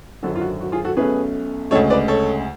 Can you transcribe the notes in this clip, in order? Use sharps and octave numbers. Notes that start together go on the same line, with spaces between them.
G#1 F#2 D3 F#4 A4
F4
F#4
F#4
F4 G#4
F#4 A4
B1 B2 A3 C#4 G#4 B4
D2 C#3 G#3 A4 C#5
B4 D5
A4 C#5